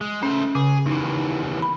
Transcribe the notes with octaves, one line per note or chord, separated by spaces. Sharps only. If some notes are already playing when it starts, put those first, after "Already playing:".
G#3
A3 C#4 C5
C#3 G#4
D#2 E3 D#4
B5